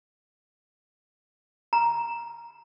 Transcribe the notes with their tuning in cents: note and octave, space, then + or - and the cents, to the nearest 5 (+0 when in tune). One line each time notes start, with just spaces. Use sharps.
A#5 +5